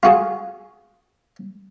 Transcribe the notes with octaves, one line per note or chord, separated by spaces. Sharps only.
F4 F#4 G#4